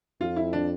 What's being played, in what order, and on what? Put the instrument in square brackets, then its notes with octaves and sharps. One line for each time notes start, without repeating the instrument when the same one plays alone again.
[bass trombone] F2 [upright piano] F4
[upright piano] E4
D4